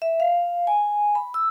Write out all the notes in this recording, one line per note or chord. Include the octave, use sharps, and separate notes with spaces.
E5
F5
G#5
B5
E6